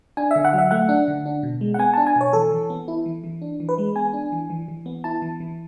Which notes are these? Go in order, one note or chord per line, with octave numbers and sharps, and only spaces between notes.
D4 G#5
E5
D3
F#5
F#3 E5
A3 F#5
D4
D3
D4
B2
G#3
F#5
B3 G#5
A5
D4
G#5
B2 C#5
E3 A4
E3
B3
E4
E3
E3
D4
E3
B4
G#3
B3 G#5
D4
E3
E3
E3
B3
E4 A5
E3
E3